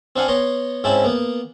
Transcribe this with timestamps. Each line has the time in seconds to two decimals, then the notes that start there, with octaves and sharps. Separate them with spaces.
0.16 C4 D4 F5 F#5 G#5
0.28 B3 C#5 A#5 C6
0.84 G#2 C4 C#4 E4 A5 B5
1.04 A#3 B3